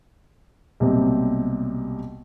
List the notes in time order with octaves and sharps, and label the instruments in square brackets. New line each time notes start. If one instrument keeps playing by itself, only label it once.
[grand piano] B1 C3 G3 A#3 C4